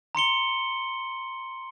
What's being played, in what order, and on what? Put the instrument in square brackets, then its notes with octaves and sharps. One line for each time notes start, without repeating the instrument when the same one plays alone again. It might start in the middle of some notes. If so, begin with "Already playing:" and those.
[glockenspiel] A#5 C6 C#7 G7